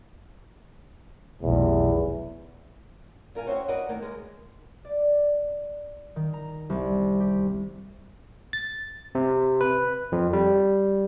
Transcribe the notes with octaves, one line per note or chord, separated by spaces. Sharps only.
F1 B1 E2
A#2 A#4 F5 G#5
C#4 F#4 C5 D#5 E5 G5
F#4 A#4 B4 D5 D#5 F#5
D#3 A#3
G#3 A#4 B4
D5
D#3
A#5
C2
G4
A6
C3
B4
F2
G3